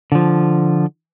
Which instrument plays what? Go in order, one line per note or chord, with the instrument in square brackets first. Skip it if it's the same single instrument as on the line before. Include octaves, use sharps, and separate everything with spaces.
[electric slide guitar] D3 F3